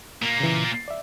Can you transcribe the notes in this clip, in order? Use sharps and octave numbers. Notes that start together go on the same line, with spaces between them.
A#2 A#3
C#3 E3
A6
D5 E5